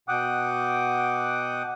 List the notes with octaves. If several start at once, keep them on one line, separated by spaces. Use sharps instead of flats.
B2 F#5 G5 D6 D#6 F#6